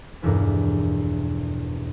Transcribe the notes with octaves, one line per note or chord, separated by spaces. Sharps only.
F1 E2 G2 B2 D4 A#4